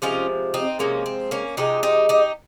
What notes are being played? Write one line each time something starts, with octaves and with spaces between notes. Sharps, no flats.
C3 F3 G#3 C#4 F4
C4 D#4
C3 F3 G#3 A#3 C#4
C4
A#3 C#4
C3 F3 G#3 D#4 G4
D#4 G4
D#4 G4